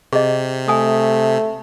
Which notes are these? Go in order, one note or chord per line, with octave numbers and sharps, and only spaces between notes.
C3 G#4 D#5
A3 G#5 D#6